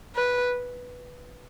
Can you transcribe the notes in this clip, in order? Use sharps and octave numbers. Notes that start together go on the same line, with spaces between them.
B4